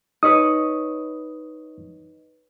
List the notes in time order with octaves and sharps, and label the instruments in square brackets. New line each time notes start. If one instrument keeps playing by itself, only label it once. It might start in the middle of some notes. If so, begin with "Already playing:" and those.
[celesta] D#4 [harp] B4 C#5 D#5 [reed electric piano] D#6